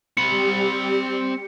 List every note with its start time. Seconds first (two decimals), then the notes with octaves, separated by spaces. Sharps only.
0.17 G3 C4 G4 B5 C#7